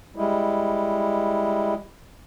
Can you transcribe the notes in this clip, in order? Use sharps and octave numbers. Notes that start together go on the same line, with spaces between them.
G3 G#3 E4